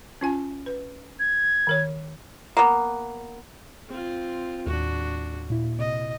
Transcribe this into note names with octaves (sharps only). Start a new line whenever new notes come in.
C#4 F4 G#5
B4
G#6
D#3 A#4 C#5
A#3 B3
C4 F4
D#2 A2 D4 F#4
A#2 E4
C3 D#5